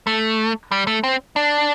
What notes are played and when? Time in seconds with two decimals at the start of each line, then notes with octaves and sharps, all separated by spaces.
0.07 A3
0.72 G3
0.87 A3
1.04 C4
1.36 D4